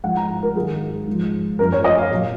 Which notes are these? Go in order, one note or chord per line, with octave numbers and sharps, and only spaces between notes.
G#2 F3 F#5
A#5
A#4
G#2 D#3 F#3 G#4
G#2 F3
F#2 F3 A#4
C#5
D#5
F5
A#2 F#3